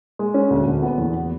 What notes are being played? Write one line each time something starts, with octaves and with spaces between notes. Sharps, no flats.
G#3
C#4
D2
D2
B3
E2